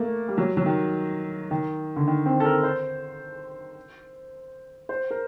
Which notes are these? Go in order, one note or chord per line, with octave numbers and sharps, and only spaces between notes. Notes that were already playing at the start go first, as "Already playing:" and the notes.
Already playing: A3 A#3
G3
F#3
F#3
D#3
D#3
D3
D#3
C4
A4
A#4
C5
C5
A#4